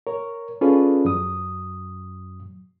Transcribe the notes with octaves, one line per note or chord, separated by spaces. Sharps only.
A#4 C#5
C#4 F4 G#4 A4 B4 D5
F#2 F#3 D#6